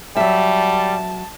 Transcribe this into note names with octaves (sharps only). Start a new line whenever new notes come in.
F#3 G3 E5 A5